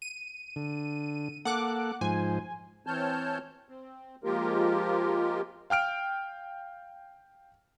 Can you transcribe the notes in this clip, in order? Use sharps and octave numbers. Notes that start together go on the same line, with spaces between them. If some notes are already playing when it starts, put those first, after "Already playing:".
D#7
D3
A#3 A4 F#5 D6 F#6
G#2 F3 C5 G#5
E3 C4 C#5 A5 F6 G6
C4
F3 G#3 A#3 F4 G4 A#4
F5 G5 F6 D7